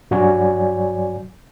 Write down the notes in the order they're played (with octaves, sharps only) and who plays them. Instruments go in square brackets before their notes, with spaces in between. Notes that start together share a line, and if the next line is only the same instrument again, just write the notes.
[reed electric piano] G2 F#3 F#4 C#5 D5 G#5